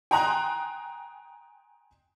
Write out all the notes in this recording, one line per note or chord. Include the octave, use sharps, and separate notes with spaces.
G5 G#5 A#5 C6 D#6 F#6